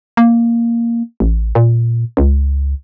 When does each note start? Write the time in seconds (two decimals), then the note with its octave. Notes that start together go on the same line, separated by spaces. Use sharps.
0.17 A#3
1.20 A1
1.55 A#2
2.17 C#2